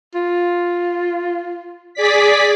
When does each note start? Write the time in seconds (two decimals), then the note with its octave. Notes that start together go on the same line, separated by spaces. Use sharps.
0.15 F4
1.94 G#4 D5 B6